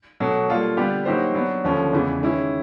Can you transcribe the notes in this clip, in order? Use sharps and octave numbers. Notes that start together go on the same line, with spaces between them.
B2 F#3 A3
G3 A#3 D4 F4 A4
D3 G3 B3 D4 G4
F#3 A#3 D#4 G4 C5
F#3 B3 D4
D#2 D3 F3 A3 C#4
E2 C#3 E3 G#3 B3
D#3 G#3 C#4 E4